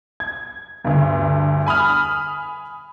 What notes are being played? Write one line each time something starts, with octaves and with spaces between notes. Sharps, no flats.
G#6
D2 G2
G#5 B5 D#6 F6